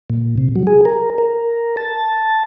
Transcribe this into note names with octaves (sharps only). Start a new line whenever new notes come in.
A#2
C3
F#3
G#4
A#4
A#4
A5